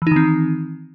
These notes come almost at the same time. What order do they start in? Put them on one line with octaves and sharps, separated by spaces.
E3 D#4 D#3 C4